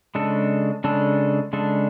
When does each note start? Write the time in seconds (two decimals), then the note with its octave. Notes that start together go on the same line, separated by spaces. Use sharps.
0.15 C#3 G#3 D4 A4
0.84 C#3 G#3 D4 A4
1.53 C#3 G#3 D4 A4